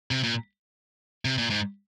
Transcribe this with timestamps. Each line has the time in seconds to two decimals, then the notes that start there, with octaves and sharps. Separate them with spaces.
0.11 C3
0.24 A#2
1.25 C3
1.38 A#2
1.50 G#2